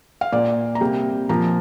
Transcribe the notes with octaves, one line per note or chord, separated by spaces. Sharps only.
F5
A#2 A#3 D5
A#5
C3 G3 A#3 G5
A#2 F3 A#3 A#5